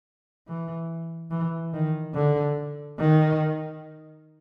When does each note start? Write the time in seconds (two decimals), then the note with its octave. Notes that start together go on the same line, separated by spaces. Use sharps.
0.48 E3
1.31 E3
1.73 D#3
2.14 D3
2.99 D#3